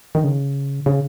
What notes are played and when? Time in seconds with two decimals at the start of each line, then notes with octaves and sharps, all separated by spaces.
0.15 D#3
0.24 C#3
0.86 C#3